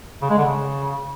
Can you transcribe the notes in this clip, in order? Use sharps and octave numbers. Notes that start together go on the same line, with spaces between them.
C#3
G#3
D3
C#3